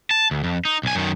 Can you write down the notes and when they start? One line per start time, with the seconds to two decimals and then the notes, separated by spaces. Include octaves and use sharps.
0.11 A5
0.31 D2
0.44 F2
0.65 D#4
0.83 B1 G#5
0.95 F#2 D#3